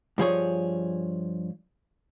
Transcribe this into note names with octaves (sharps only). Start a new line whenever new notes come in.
G2 F3 G#4 C#5